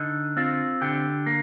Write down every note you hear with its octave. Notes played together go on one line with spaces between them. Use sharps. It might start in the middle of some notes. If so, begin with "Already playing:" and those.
Already playing: D3 D#4
C4 F4
D3 G4
A#3